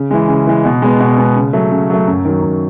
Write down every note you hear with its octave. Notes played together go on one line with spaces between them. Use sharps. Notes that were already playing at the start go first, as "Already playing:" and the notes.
Already playing: C#3
E3 G#3
C#3
E3 G#3
B2
G#3 B3
B2
G#3 B3
C#3
F#3 A3
C#3
F#3 A3
F#2
D#3 F#3
F#2